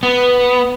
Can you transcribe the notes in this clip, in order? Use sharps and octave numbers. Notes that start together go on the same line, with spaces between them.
B3